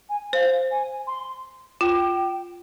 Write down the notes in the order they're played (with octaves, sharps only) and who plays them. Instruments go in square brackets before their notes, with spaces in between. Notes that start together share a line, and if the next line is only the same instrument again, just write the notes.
[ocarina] G#5
[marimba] C5 [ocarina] F5
[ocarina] G#5
C6
[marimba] F4 [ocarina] G5